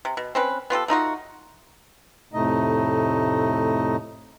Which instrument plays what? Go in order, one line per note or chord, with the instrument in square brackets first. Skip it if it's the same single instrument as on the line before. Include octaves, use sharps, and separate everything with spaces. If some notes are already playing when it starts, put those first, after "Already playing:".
[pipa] C3
B2
C4 C#4 B4
B3 F4 G4 A4
A3 D#4 F4 F#4
[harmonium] F2 A2 C3 A3 D#4 D#5